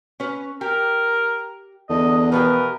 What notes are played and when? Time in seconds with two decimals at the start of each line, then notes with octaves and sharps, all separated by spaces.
0.20 C#4 B4
0.61 G4 A#4
1.89 E2 D3 D#5
2.32 B2 F3 G4 A#4 B4